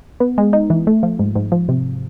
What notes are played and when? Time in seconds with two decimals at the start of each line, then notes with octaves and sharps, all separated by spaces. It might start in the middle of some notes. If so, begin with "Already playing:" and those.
0.20 B3
0.38 G#3
0.53 D#4
0.70 E3
0.87 A3
1.03 F3
1.19 G#2
1.36 G#2
1.52 F3
1.69 C3